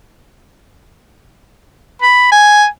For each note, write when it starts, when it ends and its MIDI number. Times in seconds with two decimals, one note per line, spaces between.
2.02 2.29 83
2.32 2.66 80